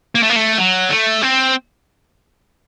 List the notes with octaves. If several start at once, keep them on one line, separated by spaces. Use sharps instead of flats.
A#3
A3
A#3
A3
F#3
A3
C4